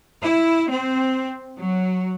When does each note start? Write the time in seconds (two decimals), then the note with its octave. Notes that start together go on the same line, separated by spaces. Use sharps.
0.21 E4
0.69 C4
1.58 F#3